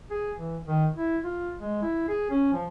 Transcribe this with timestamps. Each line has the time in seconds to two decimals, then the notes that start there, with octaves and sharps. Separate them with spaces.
0.11 G#4
0.38 E3
0.67 D#3
0.96 E4
1.24 F4
1.58 G#3
1.82 E4
2.08 G#4
2.31 C#4
2.53 F3